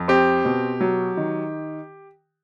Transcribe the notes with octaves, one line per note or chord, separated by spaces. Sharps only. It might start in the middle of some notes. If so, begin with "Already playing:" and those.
Already playing: F2
C4 G4
B2
F#3
D#3